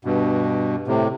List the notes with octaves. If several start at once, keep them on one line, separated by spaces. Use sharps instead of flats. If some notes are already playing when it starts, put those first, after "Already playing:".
G2 B2
A2 C3